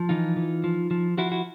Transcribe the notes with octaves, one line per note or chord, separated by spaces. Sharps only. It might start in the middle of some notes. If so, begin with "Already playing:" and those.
Already playing: F3
E3 D#4 F4
E3
F3
F3
F3 E4 F#4
E4 F#4